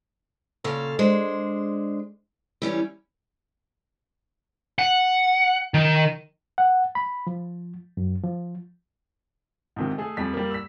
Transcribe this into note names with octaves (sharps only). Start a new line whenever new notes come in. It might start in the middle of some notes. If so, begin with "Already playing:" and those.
A#2 C#3 C#4 A4 F5
G#3 D4 C5
E3 G3 C#4
F#5
D#3
F#5
B5
F3
F#2
F3
G#2 C3 D#3
A3 G#4 A4
F2 G3 B6
G3 A#3
E6 B6